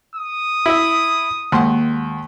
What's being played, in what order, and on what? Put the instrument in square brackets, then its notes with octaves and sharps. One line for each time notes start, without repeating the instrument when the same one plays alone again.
[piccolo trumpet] D#6
[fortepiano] E4 E5
[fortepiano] D#2 C6 [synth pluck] G#3 A#3 F#5